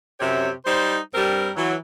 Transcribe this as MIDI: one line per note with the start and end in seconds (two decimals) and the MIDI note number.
0.20 0.50 42
0.20 0.50 48
0.20 0.50 67
0.20 0.50 73
0.20 0.50 76
0.65 0.97 55
0.65 0.97 63
0.65 0.97 72
1.14 1.50 43
1.14 1.50 55
1.14 1.50 60
1.14 1.50 70
1.56 1.74 52
1.56 1.74 54